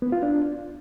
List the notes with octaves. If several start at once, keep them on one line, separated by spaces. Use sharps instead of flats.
B3
F4
D4